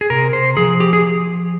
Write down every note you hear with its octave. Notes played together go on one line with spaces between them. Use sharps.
G#4
C3 A#4
C5
F3 G#4
G4
G#4